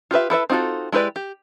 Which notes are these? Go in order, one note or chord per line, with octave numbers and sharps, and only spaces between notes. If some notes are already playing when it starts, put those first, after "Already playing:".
F4 G4 B4 E5
E4 A4 B4 E5
C4 D#4 F4 F#4 A4
G#3 E4 G4 B4 D5
G4